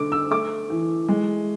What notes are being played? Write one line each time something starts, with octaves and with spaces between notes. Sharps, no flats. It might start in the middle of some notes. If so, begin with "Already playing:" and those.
Already playing: D3 A3 D6
E6
A3 D6
E3
G#3